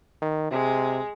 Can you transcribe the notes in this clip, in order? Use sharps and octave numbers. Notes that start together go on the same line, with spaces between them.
D#3
C3 G#3